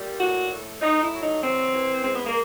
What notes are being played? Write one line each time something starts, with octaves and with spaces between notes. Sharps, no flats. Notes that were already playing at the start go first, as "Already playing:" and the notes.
Already playing: A#2 G3
A2 F#4
A2
A2 D#4
E4
F#3
D#4
E3 C4
E3
G#3 C4
B3
A#3